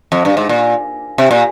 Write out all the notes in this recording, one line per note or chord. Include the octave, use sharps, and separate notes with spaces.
F2
G2
G#2
A#2
C3
A#2